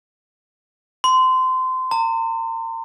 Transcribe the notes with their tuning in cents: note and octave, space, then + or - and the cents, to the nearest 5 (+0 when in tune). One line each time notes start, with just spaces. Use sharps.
C6 -25
A#5 -40